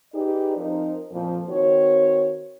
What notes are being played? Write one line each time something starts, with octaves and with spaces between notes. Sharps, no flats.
D#4 G4 G#4 B4 D5
F3 C4 D#4 A#4 C5
F2 A#2 F3
D#3 C4 F#4 C#5